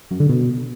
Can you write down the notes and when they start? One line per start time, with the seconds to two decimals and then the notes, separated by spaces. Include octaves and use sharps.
0.11 F#2
0.20 D3
0.29 B2